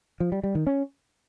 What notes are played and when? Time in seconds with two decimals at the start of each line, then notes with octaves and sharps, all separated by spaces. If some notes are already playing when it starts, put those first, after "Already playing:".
0.20 F3
0.32 G3
0.44 G3
0.55 D#3
0.67 C#4